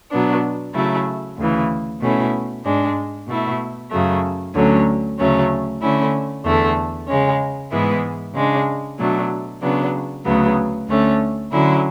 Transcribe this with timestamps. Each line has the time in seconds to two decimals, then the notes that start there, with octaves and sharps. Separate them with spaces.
0.10 B2 F#3 B3 D4
0.73 C#3 F#3 A3 E4
1.37 D2 C#3 E3
2.01 B2 A3 C#4 E4
2.64 G#2 G#3 D4
3.27 B2 A3 E4
3.91 F#2 C#3 F#3 A3
4.54 D2 D3 F#3 C#4
5.18 D2 C#3 F#3 A3 C#4
5.81 D3 A3 C#4 E4
6.44 E2 D3 A3
7.08 C#3 G#3 C#4
7.71 G#2 E3 G#3 B3 E4
8.34 C#3 G#3 D4
8.98 B2 F#3 A3 D4
9.61 C#3 F#3 B3 D4
10.24 D2 C#3 F#3 B3
10.87 D2 D3 A3 C#4
11.51 D3 F#3 C#4 E4